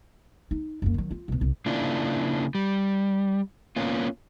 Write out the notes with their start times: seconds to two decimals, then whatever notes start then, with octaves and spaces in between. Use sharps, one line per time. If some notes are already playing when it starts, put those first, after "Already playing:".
0.51 D#4
0.82 F#2 A#3
0.94 D#3 F#3
1.11 F4
1.28 C2 B2
1.41 C2
1.66 C#3 A#3 D4 E4 F4
2.55 G3
3.76 A#3 B3 C#4 F4